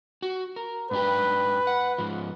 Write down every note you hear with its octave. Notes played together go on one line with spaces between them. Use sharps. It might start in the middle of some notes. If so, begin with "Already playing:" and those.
F#4
A#4
G#2 D4 G4 B4
F#5
G#2 F3